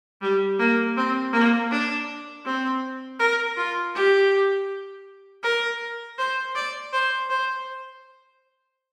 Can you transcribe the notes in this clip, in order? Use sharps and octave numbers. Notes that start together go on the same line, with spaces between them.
G3
A#3
C4
A#3
D4
C4
A#4
F4
G4
A#4
C5
D5
C5
C5